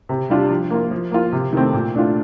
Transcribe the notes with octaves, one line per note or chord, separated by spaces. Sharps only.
C3
G3 D4 F4
F3
A#3 F4
F3
A#3 F4
C3
D#3 A3 C4
A#2
A3 D4 F4